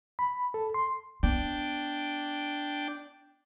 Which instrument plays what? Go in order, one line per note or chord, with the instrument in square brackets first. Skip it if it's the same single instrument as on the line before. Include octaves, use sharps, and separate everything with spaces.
[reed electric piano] B5
A4
C6
[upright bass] B3 [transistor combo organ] D4 G5